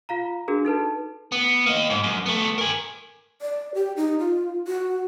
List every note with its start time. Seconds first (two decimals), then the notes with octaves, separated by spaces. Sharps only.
0.09 F4 F5 A#5
0.48 D4 F#4 G#4 A#4
0.65 D#4 A4 B4 A5
1.32 B3
1.66 A#3 D#5
1.90 G#2
2.03 F#2
2.26 A3 B3
2.58 A#4 G#5
3.42 D5
3.74 G4
3.97 D#4
4.19 F4
4.67 F#4